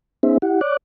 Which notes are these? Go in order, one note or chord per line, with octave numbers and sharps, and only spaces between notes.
B3 C#4 D#4 G#4 C5 E5
E4 G4 F#5
C#5 D5 D6 F#6